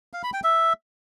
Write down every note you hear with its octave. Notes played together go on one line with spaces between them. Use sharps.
F5
B5
G5
E5